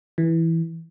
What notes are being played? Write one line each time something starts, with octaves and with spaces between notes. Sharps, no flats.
E3